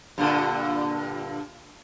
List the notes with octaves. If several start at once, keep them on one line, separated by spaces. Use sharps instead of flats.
G2 A#2 D3